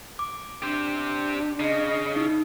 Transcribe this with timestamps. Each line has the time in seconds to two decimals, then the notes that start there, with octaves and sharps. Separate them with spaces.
0.19 D6
0.62 D4 G4 C5
1.60 C#3 D#5
2.16 D#4 E4